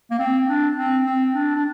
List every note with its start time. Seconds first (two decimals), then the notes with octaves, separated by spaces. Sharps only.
0.11 A#3
0.19 C4
0.48 D4
0.77 C4
1.06 C4
1.34 D4
1.56 D4